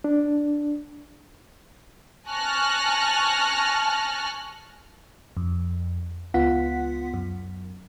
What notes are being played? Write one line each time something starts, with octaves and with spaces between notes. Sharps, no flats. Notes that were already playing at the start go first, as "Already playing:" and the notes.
D4
G#5 A5 C#6 F6 F#6 A#6
F2
C#2 B3 F4 F#5 B6
F#2